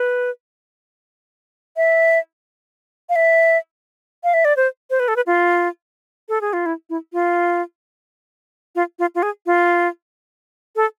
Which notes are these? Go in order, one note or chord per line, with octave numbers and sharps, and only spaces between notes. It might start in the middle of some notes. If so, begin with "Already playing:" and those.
Already playing: B4
E5
F5
E5
F5
E5
D5
C5
C5
B4
A4
B4
F4
A4
G#4
F4
E4
E4
F4
F4
F4
F4
G#4
F4
A4